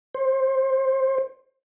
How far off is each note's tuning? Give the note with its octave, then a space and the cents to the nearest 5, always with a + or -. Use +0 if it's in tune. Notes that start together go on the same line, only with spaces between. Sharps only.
C5 +25